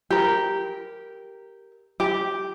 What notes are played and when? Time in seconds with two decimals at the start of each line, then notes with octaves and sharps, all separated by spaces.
0.10 G4 A#4
2.00 G4